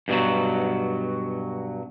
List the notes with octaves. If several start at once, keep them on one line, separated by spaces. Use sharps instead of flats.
G2 B2 D#3 F#3